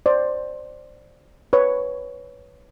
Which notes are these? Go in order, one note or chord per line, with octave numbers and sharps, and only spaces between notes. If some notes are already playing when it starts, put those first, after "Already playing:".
C5 D5
B4 C#5